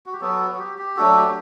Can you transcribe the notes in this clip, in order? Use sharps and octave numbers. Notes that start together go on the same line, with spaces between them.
F#4
G4
F#3 B3 F#4 A4
F#4
G4
G4
F#3 A3 D4 F#4 A4
G4